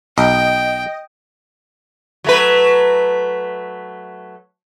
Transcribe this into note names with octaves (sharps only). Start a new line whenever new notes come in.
B1 D#5 G5
F#3 A3 B4